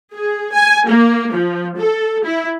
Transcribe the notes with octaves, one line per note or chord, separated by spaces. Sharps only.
G#4
G#5
A#3
F3
A4
E4